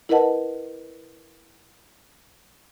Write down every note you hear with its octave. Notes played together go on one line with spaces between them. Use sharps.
E4 A#4 B4 D#5 F#5 A5